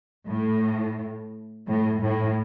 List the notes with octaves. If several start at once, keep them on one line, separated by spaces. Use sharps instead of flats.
A2
A2
A2